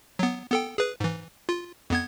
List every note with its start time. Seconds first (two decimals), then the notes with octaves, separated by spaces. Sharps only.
0.19 F#3 B3
0.51 B3 A4 G5
0.78 G#4 B4
1.00 G#2 E3
1.49 F4
1.90 F2 B3 G#6